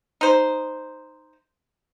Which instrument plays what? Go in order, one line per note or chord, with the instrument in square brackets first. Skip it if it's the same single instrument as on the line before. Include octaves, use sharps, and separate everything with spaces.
[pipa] D#4 C5